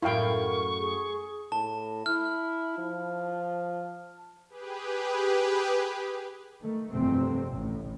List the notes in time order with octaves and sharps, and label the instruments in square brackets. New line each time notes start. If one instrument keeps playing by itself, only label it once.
[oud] F#2 A2 [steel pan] E4 F5 G5 [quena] A#4 [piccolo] C#6
[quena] G#4
[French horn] A2 [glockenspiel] A5
[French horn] E4 [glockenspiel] F6
[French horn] F3
[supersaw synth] G4 G#4 B4
[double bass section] D#3 A3
F1 E2 G2 C3 A3 C4
A1 A2